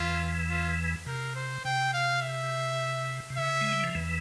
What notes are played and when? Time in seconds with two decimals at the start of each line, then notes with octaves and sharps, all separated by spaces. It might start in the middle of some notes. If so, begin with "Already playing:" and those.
Already playing: E2 E3 F4
0.50 F4
1.06 C3 A#4
1.36 C5
1.65 C3 G5
1.94 F5
2.22 E5
3.30 C3
3.38 C#3 E5
3.61 G#3
3.73 G3
3.84 F3
3.95 E2 E3